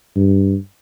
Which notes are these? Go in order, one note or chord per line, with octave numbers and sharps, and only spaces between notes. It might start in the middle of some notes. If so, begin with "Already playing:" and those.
G2